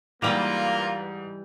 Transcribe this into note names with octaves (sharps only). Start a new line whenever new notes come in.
G#2 E3 G3 A#3 F4 B4 D6 F7